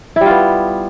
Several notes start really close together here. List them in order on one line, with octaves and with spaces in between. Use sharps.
E4 G3 F4 B3